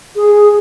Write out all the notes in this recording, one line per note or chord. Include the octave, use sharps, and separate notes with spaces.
G#4